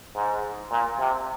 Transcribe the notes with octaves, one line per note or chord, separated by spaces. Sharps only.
G#2
A#2
C3